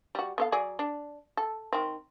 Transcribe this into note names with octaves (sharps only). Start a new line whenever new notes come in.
G3 F#4
B3 A4 F5
F#3 G#4 D5
D4
A4
D#3 C4